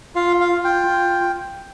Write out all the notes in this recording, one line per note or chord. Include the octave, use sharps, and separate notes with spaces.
F4 F5
F5
F4
G5
F4